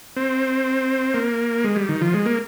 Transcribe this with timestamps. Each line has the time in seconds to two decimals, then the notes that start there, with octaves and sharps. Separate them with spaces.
0.16 C4
1.14 A#3
1.64 G#3
1.76 G3
1.89 D#3
2.01 F3
2.14 G#3
2.26 A#3